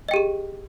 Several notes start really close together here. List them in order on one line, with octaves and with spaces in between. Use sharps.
D#5 G5 G4 G#4